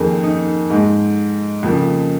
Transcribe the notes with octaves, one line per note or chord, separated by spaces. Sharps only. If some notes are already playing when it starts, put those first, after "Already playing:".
Already playing: F2 D#3 A#3 G#4
D#4
G#2 G#3
F2 C#3 F3 A#3